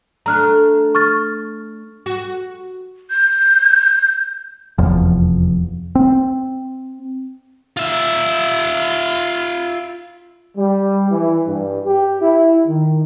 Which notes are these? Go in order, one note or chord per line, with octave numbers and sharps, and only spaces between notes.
A3 D4 A#5 F6 F#6
C#6 F6 A6
F#4
G6
F1 E2 F3
C4
F4 E5
G3
E3
G2
G4
E4
D#3